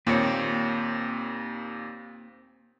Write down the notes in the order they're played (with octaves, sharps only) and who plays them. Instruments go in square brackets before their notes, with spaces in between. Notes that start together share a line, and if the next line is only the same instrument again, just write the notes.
[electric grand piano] D#2 A#2 [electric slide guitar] A#3 C4 C#5